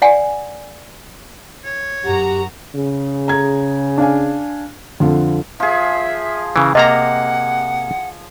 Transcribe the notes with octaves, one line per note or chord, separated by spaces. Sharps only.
D5 F#5 G#5
C#5
F#2 F#4 G4 A#5
C#3 G#4
A#5 G#6
D4 F5 G#5
F2 D3 F4
F3 G#4 E5
C#3 E3
C3 A#3 D#5 F#5 A#5